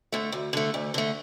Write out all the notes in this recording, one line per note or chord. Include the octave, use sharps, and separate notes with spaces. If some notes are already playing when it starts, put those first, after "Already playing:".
D3 A3
D2
D3 A3
D2
D3 A3